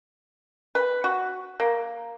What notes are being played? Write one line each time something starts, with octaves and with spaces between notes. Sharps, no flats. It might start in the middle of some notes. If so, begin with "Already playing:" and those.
B4
F#4
A#3